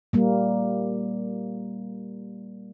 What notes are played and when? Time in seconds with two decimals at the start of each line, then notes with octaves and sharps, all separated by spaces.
0.13 G3 A#3